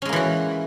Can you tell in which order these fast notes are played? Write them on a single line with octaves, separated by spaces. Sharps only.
C#4 G#3 A#3 E3 F#4